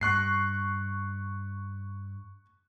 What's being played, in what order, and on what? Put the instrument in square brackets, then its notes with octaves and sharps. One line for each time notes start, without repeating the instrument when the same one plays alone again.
[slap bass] G2 [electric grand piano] C#6 F#6 C7